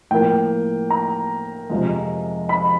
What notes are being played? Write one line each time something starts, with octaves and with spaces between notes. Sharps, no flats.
A2 F3 A#3 G5
A#5
F2 C3 F3 G#3
B5